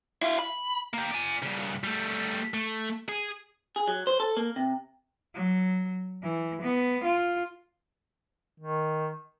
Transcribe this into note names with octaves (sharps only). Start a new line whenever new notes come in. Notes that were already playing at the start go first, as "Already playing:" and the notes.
E4 F5
B5
A#3 G4
D5 G#5
G2 C#3
G3 A3
A3
G#4
G#4
F#3
C5
A4
A#3
C3
F#3
E3
B3
F4
D#3